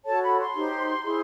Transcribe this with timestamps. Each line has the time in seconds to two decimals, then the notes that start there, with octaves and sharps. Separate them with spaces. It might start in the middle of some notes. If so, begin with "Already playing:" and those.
0.05 F#4 A4 C#5 A5
0.23 B5
0.39 C6
0.54 D#4 G4 C5
1.03 E4 G#4 C5